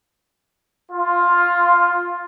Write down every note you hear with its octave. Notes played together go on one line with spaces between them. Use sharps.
F4